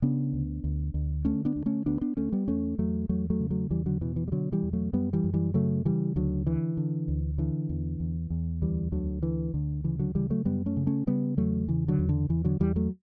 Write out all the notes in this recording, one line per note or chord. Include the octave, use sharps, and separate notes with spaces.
C#3 B3 D4
D2
D2
D2
D3 A3 C#4
B3 D4
D2
A3 C#4
D2 B3 D4
B3 D4
D2 A3 C#4
G3 B3
E2 A3 C#4
E2 F#3 A3
E2 F#3 A3
F#3 A3
C#3
F#3 A3
E2 E3 G3
D3 F#3
B2 E3
E3
G3
B2 D3 F#3
E3 G3
E2
F#3 A3
F#2 G3 B3
E3 G3
F#2
E3 G3
C#3 F#3 A3
C#3 E3 G3
D2 D3 F#3
D3 E3
D3
D2
D3 E3
E2
E2
E2
D2 E3 G3
D2 D3 F#3
D3 E3
D2 D3
C#3 E3
D3 F#3
C#3 E3 G3
F#3 A3
F#2 G3 B3
A3 C#4
C#3
A3 C#4
C#3 G3 B3
E2 F#3 A3
C#3 E3
D3 F#3
E2
D3
E2 E3
D3 F#3
E2 E3 G3
F#3 A3